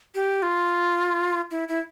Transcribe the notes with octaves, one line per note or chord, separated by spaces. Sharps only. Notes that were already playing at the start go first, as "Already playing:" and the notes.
G4
F4
E4
E4